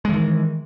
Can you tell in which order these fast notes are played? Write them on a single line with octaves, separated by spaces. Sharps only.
G#3 E3 D#3